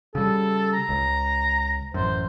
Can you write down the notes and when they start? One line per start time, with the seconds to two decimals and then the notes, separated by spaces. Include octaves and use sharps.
0.15 C#3 G3 A4
0.73 A#5
0.89 C#2
1.94 A1 F#2 C5